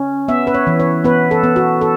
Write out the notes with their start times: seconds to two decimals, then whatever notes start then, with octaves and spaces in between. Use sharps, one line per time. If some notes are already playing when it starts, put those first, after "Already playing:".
Already playing: C#4
0.28 B3 E5
0.47 B4
0.54 C#5
0.67 E3
0.80 C#5
1.04 B3 B4
1.31 A4
1.44 B3
1.56 F#4
1.81 A4